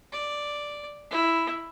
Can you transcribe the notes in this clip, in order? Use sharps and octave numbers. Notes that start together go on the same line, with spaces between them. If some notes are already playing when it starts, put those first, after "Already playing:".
D5
E4